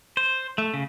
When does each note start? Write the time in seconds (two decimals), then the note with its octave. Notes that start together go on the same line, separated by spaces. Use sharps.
0.17 C5
0.58 A3
0.74 C#3